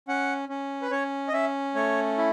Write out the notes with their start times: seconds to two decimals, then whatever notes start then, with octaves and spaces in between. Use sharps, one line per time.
0.08 C#4 F#5
0.49 C#4
0.82 B4
0.91 C#4 C#5
1.28 D#5
1.33 C#4 E5
1.75 A3 C#5
2.17 E4